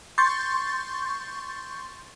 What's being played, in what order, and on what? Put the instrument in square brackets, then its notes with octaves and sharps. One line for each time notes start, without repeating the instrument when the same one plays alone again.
[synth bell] C6 C#6 G6 A6